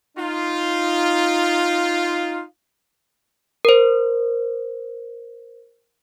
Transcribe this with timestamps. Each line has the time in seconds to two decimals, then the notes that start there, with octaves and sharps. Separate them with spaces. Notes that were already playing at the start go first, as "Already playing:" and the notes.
0.18 D#4 F4
3.65 A#4 C5